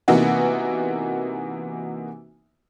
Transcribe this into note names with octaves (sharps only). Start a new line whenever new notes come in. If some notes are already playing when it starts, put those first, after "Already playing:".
C3 E3 A#3 B3 D#4 F#4